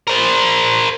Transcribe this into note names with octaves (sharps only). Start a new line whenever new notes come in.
A#4 C5